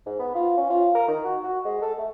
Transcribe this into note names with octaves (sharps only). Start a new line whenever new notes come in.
G#2
B3
F4
C#4
F4
A#4
D#3
F#4
F#4
G#3
A4
A3